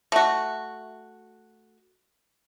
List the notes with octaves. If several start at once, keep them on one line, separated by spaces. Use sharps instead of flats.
A3 F#4